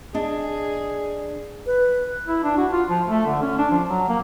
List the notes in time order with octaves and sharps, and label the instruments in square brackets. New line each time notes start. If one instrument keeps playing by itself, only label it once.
[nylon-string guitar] D4 D#5 [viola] G#4
[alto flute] B4
[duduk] E4
D4
F#4
F4
F3
A3
D3
C#4
D4
F3
F#3
A#3